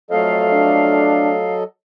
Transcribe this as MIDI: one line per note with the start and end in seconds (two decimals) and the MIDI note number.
0.11 1.54 41
0.11 1.64 54
0.11 1.54 57
0.11 1.64 69
0.11 1.64 75
0.11 1.54 77
0.52 1.32 62